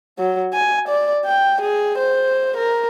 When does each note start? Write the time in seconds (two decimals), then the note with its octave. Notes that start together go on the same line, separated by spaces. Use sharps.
0.18 F#3
0.53 G#5
0.89 D5
1.25 G5
1.62 G#4
1.98 C5
2.57 A#4